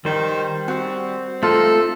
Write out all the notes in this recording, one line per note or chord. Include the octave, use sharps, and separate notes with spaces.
D#3 G3 C5
C4 F#4
A3 D#4 F4 A4